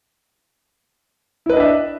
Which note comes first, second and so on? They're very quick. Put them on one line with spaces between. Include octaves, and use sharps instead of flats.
E4 B4 D#5 D4 E5